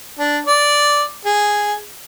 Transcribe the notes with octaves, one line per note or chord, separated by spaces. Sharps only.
D4
D5
G#4